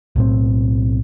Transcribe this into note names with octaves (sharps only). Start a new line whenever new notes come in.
B1 A2 C4